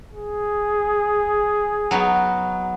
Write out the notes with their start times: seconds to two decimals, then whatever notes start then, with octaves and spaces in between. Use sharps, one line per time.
0.13 G#4
1.91 F#3 B3 D#4